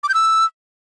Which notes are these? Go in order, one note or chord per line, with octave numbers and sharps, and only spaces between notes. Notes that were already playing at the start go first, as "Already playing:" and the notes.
D6
G6
E6